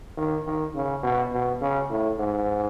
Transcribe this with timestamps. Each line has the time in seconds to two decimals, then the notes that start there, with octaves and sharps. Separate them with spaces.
0.17 D#3
0.46 D#3
0.75 C#3
1.03 B2
1.32 B2
1.61 C#3
1.90 A2
2.18 G#2